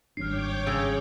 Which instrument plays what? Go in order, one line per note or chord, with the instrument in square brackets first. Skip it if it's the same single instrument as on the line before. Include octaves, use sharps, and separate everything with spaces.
[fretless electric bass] G#1 G2 D4 [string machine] C#5 G5 D6 [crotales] F6 C7
[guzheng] C#3 [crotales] D#6 E6 G#6